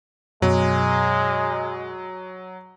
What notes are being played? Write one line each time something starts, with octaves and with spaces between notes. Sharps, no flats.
F#2 B2 F#3 G#3